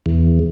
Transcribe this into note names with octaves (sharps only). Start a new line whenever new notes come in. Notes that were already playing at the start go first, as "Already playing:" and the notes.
E2